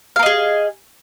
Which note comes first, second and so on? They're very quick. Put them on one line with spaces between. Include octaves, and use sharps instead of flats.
F5 A#4 D#5 G#4